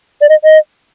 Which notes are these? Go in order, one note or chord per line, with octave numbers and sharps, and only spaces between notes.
D5
D#5
D#5